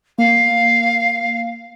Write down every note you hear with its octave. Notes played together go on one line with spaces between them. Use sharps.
A#3 F5